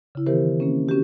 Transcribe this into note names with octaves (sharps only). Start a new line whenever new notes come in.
C#3 E4
D#3 E3 B3 G4 A#4 C5
A#3 C4 C#4
C4 C#4 F#4 G4